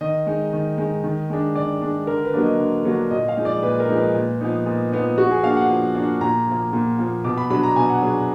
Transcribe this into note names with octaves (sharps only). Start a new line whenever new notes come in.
D#3 D#5
G#3 D#4
D#3
G#3 D#4
D#3
G#3 D4
D#3 D5
G#3 D4
D3 A#4
B4
F#3 A#3 D4
D#5
D3
F#3 A#3 D4
A#2 D#5
F5
F3 G#3 D#4
D5
A#2 B4
A#4
F3 G#3 D#4
B4
A#2
F3 B3 D#4
A#2
F3 B3 D#4
F3 F#4
G#4
A#3 D4 F5
F#5
F3
A#3 D4
A#2 A#5
F3 A#3
A#2
F3 A#3
B2 D6
B5
F#3 D4 B5
A#5
B2 G#5
F#5
F#3 D4 G#4